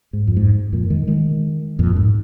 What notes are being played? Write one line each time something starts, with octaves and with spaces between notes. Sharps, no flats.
G#2
F2
G#2
F2 A#2
D#3 G#3
D#3 G#3
F2 A#2
G#2